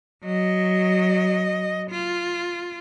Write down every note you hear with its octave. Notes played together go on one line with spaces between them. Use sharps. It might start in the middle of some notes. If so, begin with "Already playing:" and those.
F#3 D#5
F4